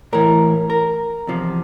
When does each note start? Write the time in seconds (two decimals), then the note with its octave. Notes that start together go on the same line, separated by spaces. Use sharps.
0.13 A2 E3 A#4
0.70 A#4
1.27 E2 C3 F3